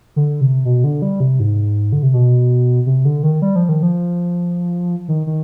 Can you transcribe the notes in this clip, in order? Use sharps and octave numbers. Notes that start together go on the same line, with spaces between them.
D3
C3
B2
D3
G3
C3
G#2
D3
C3
B2
C3
D3
D#3
G3
F3
D#3
F3
D#3
D#3